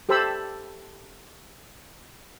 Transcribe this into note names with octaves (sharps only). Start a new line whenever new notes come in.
G4 A4 C5 A5 B5 E6